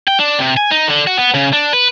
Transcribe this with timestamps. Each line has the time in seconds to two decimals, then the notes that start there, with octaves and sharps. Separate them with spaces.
0.08 G5
0.19 D4
0.39 C3
0.57 G#5
0.71 D#4
0.87 D3
1.07 F#4
1.19 B3
1.34 C#3
1.53 D4
1.73 B4